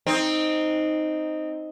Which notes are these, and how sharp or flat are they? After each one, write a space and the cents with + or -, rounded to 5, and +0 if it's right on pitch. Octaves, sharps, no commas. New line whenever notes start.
C4 +0 D#4 +0